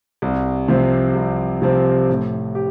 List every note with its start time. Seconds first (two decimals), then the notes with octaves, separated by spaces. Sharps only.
0.22 C2
0.68 C3 F3 C4
1.15 C2
1.62 C3 F3 C4
2.09 A2
2.55 G4